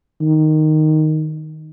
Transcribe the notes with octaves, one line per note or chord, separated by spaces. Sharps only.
D#3